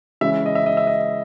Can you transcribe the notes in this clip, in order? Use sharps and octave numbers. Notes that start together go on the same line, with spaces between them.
C#3 E3 G#3 C#4 E5
D#5
E5
D#5
E5
D#5